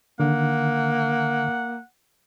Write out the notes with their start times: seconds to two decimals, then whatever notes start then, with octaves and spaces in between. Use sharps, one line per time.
0.20 D3 D#3 A#3 F#5